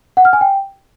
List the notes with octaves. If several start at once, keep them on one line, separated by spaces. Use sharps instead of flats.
F#5
F6
G#5
G5